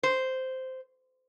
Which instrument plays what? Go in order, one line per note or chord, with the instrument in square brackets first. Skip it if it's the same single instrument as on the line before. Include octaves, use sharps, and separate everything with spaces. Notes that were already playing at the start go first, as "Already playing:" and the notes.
[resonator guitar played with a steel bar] C5